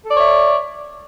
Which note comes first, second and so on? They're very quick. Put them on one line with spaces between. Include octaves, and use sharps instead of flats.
A4 D5 C#5 E5